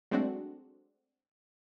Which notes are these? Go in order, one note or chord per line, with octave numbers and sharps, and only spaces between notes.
F#3 G#3 A3 C4 D4 F#4